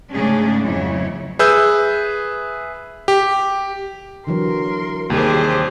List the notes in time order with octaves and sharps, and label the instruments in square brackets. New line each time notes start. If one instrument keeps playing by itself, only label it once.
[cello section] G#2 C#3 A3 C#4 D4 G#4
F2 C#3 F#3 E4 C#5
[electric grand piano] G#4 B4 E5 E6 G6
G4
[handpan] D3 E3 F#3 [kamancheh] A#4 C6
[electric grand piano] D#2 [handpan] C3 G3 [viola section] G4 G#4 C5